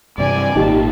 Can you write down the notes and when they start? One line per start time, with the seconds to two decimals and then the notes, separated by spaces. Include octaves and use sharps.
0.18 G2 C3 E3 D5 G#5
0.56 G#1 A#2 D#3 D#4 G4 A5